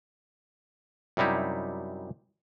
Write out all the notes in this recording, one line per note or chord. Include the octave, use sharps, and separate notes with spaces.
F#2 C3 G3 D#4 E4